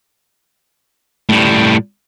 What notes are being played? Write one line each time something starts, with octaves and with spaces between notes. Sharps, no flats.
A2 G3